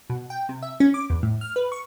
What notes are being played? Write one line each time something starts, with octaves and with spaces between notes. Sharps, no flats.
B2
G5
C3
E5
C#4
D6
E2
A2
F6
B4
C#6